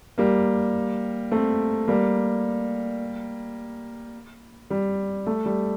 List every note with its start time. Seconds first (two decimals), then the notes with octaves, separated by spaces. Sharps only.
0.18 G3 A#3
1.31 A3 C4
1.87 G3 A#3
4.70 G3
5.26 A3
5.45 G3